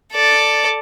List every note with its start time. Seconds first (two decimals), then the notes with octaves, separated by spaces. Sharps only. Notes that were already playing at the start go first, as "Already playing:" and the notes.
0.13 A4 D5